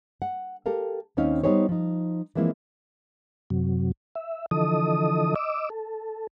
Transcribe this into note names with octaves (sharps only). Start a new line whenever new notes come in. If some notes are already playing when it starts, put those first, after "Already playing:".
F#5
G4 A4 A#4 F5
D#2 C4 C#4 D#4 F5
G3 B3 D#4 G4 C5 C#5
F3 D#4
E3 F3 G#3 A#3 C4 E4
F#2 C3 F#3
E5
D3 E3 F3 A4 D#5 D#6
D#5 D6 E6
A4